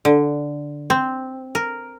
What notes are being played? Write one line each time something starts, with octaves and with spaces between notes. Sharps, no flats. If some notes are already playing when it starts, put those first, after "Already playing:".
D3
C4
A#4